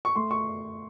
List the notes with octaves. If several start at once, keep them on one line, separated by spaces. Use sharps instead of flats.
C#6
A3 C6
C#6